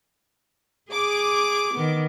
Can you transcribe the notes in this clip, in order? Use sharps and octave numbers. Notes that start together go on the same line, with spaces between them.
G#4 D6
D#3 B3